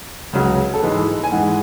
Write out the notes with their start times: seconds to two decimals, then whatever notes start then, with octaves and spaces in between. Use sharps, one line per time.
0.33 C#2 C#3 F#3
0.74 A4
0.82 G#2 E3 G#3 B4
1.23 G#5
1.32 G#2 E3 G#3 F#5